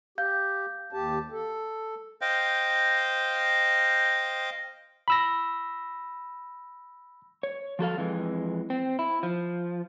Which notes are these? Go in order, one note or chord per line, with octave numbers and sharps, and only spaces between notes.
G4 F5 G6
D#2 G4 A5
A4
C5 D#5 F5 G5
B5 E6 A#6
C#5
F3 F#4 A4 F5
F2 E3 G#3
C4
E4
F3